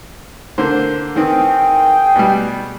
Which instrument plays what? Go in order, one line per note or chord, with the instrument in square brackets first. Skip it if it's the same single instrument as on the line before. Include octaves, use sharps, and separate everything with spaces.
[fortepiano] D3 A#3 C5
[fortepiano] D#3 E3 C4 [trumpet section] G#4 G5
[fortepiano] B2 G3